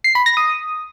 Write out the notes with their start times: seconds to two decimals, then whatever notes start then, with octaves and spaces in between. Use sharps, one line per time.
0.04 C7
0.15 B5
0.26 A#6
0.37 D#6